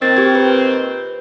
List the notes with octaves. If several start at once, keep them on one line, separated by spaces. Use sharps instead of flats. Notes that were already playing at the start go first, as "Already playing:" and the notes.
A#2 D#3 C4 A6
G4 G#6
B4